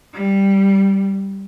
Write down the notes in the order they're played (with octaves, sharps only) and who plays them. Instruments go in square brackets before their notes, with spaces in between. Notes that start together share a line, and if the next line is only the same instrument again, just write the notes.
[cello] G3